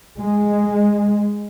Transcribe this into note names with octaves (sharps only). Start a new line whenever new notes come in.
G#3